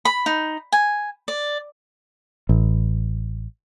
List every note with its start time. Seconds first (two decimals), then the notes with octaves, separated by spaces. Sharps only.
0.05 B5
0.26 D#4
0.72 G#5
1.28 D5
2.49 A1